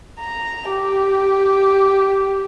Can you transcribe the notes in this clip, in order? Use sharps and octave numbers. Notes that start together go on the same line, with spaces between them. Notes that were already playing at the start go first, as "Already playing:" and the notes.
A#5
G4